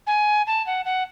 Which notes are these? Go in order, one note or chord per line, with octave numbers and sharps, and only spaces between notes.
G#5
A5
F#5
F#5